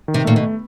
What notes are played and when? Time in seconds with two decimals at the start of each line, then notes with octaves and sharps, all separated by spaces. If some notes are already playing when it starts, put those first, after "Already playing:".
0.08 D#3
0.14 C3
0.25 A#2 A3
0.36 B2